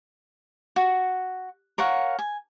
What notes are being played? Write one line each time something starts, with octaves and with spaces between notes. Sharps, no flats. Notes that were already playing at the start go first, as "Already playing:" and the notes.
F#4
A#4 C#5 F5 F#5
G#5